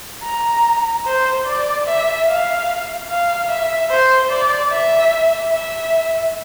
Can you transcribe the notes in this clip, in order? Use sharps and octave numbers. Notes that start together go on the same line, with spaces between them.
A#5
C5
D5
E5
F5
F5
E5
C5
D5
E5
E5